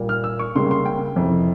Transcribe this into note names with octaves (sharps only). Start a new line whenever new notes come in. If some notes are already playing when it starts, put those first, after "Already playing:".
Already playing: A#2 G3 A#3
F6
E6
C#6
C#2 C#3 G3 A#3 C6
C6
G5
F2 C3 E3